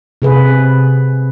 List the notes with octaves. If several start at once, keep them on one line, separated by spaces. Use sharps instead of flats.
C3 G#4 B4